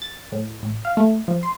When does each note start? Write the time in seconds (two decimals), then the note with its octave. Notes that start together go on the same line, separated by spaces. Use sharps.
0.02 A6
0.32 A2
0.62 A1
0.85 F5
0.97 A3
1.28 F3
1.43 C6